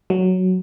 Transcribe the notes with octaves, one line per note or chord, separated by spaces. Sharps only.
F#3